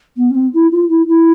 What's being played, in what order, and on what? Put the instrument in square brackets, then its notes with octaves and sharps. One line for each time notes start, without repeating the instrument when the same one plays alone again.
[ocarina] B3
C#4
C4
E4
F4
E4
E4